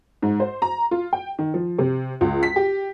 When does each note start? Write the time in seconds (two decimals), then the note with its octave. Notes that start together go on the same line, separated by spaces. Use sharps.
0.22 G#2
0.40 C5
0.62 A#5
0.91 F4
1.13 G5
1.39 D#3
1.54 F3
1.79 C3
2.21 C#2
2.43 B6
2.56 G4